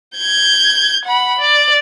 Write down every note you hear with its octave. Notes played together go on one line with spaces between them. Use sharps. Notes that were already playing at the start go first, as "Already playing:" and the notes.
G6 G#6
F#5 B5
D5